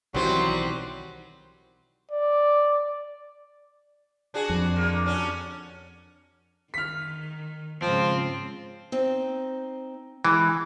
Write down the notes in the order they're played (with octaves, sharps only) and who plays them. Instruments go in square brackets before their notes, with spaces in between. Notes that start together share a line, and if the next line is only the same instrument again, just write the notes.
[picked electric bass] B1 D#3 E3 [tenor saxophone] F#3 [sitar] G3 C4 [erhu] C6
[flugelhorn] D5
[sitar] D4 F#4 G#4
[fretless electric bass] F2
[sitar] D3 A#3
C#4 D4 F#4
[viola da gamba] D#3 [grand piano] F6 B6
[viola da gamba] G#2 C#3 [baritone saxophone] F3 [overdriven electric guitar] C4
[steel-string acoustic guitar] C4 D#4
[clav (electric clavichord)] E3 [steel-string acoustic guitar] G#3